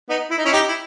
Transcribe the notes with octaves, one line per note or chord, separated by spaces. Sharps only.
B3 D#4
E4
D#4
C#4 E4
D#4 G4
E4